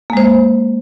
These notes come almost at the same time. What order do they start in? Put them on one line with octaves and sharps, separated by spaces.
A#3 G#3 C5